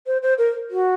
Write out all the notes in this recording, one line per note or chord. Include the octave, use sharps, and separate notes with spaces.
C5
C5
A#4
F#4